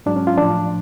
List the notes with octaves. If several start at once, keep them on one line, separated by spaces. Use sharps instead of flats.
G#2 F#3 D4
C#4
F4
A2 F3 D4